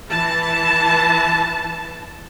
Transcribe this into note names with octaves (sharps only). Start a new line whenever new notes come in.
E3 A5